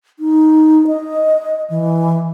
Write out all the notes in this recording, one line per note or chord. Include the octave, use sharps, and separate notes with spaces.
D#4
D#5
E3